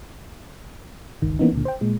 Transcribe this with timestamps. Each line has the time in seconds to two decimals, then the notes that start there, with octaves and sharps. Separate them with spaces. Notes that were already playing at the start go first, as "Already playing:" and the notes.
1.22 G1 C#2 D#3
1.39 E3 A#3 B3 C#4 D#4
1.53 C#2 A#2 D3
1.65 C5 G5
1.81 A#2 G#3